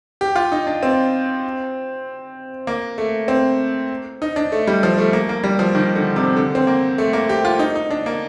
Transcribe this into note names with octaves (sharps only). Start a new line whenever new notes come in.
G4
F4
D#4
D4
C4
A#3
A3
C4
D#4
D4
A3
G3
F3
A3
A#3
A#3
G3
F3
D#3
D3
C3
D3
C4
A#3
A3
A#3
G4
F4
D#4
D#4
D4
A#3